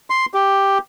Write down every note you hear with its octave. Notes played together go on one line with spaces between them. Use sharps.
C6
G4